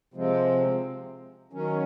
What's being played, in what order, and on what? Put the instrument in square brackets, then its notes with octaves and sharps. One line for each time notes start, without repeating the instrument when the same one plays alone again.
[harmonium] C3 F3 G#3 C4
D#3 F#3 C#4